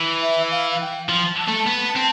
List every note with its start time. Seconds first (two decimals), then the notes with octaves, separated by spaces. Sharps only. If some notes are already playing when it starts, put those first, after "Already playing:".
Already playing: E3
0.22 E5
0.51 F5
0.70 F5
0.80 G5
1.09 F3
1.38 A5
1.48 A3
1.67 B3
1.96 C4